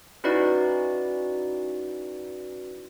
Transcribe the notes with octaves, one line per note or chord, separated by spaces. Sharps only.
C#4 D#4 E4 F#4 B4 D5